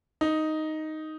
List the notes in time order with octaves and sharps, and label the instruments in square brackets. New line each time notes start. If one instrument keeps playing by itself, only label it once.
[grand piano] D#4